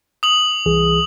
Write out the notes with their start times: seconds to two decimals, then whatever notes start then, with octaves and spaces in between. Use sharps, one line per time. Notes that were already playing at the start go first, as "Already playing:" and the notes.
0.23 D#6 F#7
0.66 C2 E3 G#4